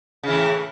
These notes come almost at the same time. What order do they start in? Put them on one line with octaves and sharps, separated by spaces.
C#3 E3 A2